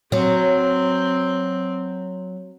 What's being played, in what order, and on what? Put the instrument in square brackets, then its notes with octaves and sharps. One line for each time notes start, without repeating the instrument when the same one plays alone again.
[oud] F#3 [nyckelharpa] C4